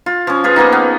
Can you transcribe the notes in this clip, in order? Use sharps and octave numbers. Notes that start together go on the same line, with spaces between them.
F4
F3 C#4
F4 G#4 B4
F3 A#3 B3 D#4
B3